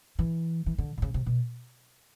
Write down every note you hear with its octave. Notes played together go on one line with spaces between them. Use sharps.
E3
E3
D3
D3
C#3
C3
B2